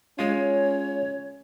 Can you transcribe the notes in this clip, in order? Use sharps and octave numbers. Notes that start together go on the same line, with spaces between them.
G#3 C#4 F4 C#5